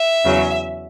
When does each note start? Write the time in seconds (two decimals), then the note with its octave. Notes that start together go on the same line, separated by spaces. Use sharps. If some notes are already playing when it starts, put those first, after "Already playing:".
Already playing: E5
0.25 E2 C#3 F#3